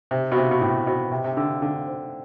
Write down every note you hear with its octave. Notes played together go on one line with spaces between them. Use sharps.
C3 C5
B2
C3 C5
B2
A2 G5
B2 C5
C3 G5
C3
D3 G5
D3 G5
C5